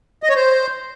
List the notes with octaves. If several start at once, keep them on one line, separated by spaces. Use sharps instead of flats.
D#5
C#5
C5